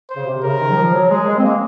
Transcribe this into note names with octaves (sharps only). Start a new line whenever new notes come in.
C5
C#3
C3
C#3 A#4
D#3
F#3
F3
F#3
G#3 G#4
G#3
C4
A#3